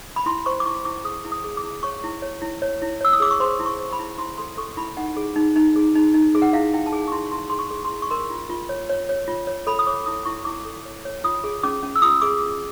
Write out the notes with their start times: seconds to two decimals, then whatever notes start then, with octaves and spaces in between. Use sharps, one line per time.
0.16 B5
0.26 E4 C6
0.46 C5 C#6
0.60 D6
0.66 E4 C#6
0.85 E4 D6
1.04 G#4 D#6
1.25 E4
1.32 D#6
1.44 G#4
1.57 D6
1.63 E4
1.83 C#5 C#6
2.04 E4
2.22 C#5
2.42 E4
2.62 C#5
2.82 E4
3.01 C#5 E6
3.13 D#6
3.20 G#4 D6
3.31 C#6
3.40 C5 C6
3.59 E4
3.66 C#6
3.79 C5
3.93 B5
3.99 E4
4.18 E4 C6
4.38 A4 C6
4.57 A4 C#6
4.77 E4 B5
4.97 D#4 F#5
5.17 G#4
5.36 D#4
5.56 D#4
5.76 G#4
5.95 D#4
6.14 D#4
6.35 G#4
6.42 F#5
6.53 E4 F5
6.73 E4 G5
6.86 A5
6.93 G#4 G#5
7.08 C#6
7.12 E4 C6
7.32 E4 C6
7.50 G#4 C6
7.59 C#6
7.71 G#4
7.85 C6
7.91 E4
8.02 C#6
8.11 A#4 C6
8.30 F4
8.50 F4
8.69 C#5
8.89 C#5
9.09 C#5
9.28 F4
9.47 C#5
9.67 A4 B5
9.79 D#6
9.87 C#5 D6
10.06 E4 D#6
10.25 E4 C#6
10.45 E4 D6
10.65 A4
10.85 C#5
11.05 C#5
11.24 F4 D#6
11.44 G#4
11.63 C#4 D6
11.83 C#4
11.96 E6
12.02 F4 D#6
12.21 G#4 D6